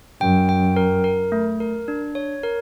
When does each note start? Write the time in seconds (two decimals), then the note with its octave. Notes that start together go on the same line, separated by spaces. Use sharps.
0.21 F#2 G5
0.49 G5
0.76 A#4
1.04 A#4
1.32 A3
1.60 A#4
1.88 D4
2.15 C#5
2.43 A#4